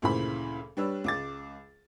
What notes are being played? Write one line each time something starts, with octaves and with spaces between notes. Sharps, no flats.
D2 A#2 C#3 E3 C5 B5
G3 D4 B4 C#5 E6
C#2 D6 A6